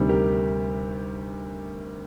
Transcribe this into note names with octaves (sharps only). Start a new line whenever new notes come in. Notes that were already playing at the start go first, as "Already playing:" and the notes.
Already playing: D2 C3 D#3 G3
G4 A#4